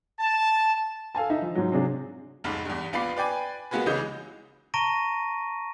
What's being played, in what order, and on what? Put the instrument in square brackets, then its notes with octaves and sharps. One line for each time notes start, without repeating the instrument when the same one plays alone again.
[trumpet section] A5
[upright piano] A4 F5 G#5 A5
D#4 E5
F3
G#2 F#3
C3 F#3 D4 G#4
[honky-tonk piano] F1 B1 G#2 B5
E2 G2
A#1 B3 F4 D5 B5 C7
B4 D5 G5 G#5 B5
G#3 A#3 B3 F#4 G#4 B4
C2 C#3 E3 G#3 D#5 G6
[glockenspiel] A5 A#5 C#6 A#6 D7 D#7